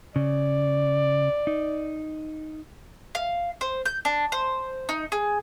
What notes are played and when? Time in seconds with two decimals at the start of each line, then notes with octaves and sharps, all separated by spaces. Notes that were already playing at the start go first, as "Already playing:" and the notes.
0.16 C#3 D5
1.47 D#4
3.15 F5
3.61 C5
3.86 G6
4.05 D4
4.32 C5
4.89 D#4
5.12 G#4